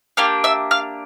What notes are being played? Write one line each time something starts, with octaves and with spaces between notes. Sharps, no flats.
A#3 D4 G4 F5 F6
E5 E6
F5 F6